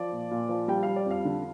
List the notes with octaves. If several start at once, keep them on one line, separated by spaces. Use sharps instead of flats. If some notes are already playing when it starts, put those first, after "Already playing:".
Already playing: F3 D5
A#2
A#2
F3
G3 G5
G3 F5
D5
F2 F5
D3